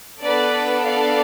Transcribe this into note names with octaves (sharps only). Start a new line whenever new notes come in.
B3 D4 A4 B4 D5
D5 F5